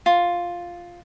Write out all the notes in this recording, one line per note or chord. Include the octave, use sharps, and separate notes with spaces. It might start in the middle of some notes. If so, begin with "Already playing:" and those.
F4